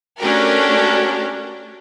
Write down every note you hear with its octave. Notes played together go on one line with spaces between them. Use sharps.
A3 C#4 D4 F#4 G4 A#4